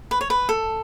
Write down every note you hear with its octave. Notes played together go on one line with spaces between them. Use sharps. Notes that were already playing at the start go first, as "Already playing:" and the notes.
B4
C#5
B4
A4